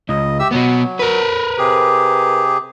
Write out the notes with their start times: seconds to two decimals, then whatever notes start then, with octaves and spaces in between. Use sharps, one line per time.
0.09 C#2 D#5
0.39 G4 E5 E6
0.52 B2 F#3 B3
1.00 A#4 B4
1.58 C3 G4 G#4